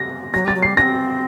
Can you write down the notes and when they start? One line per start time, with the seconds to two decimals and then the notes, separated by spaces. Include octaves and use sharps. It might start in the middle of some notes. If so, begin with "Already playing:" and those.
Already playing: A#6
0.34 F#3 A#6
0.45 G3
0.48 A6
0.55 F#3
0.62 C7
0.66 G3
0.77 C4 D4 A#6